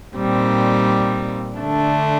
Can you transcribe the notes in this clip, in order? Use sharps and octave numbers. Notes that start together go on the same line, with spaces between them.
A#2 G3 C4 D#4
D3 A3 D4